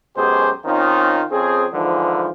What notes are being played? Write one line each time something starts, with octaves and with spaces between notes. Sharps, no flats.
F#2 B2 G#3 G4 G#4 C5
D#3 C4 C#4 D#4 F4
F2 C4 C#4 G#4
G#2 D3 E3 F3